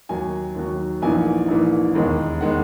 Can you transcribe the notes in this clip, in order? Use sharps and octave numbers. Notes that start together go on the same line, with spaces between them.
D#2 D#3 F#3 G#5
D#2 D#3 F#3
A#1 G#2 E3 A#3 G#5
A#1 G#2 E3 A#3
E1 D#2 D#3 G#3
D#3 G#3 F#5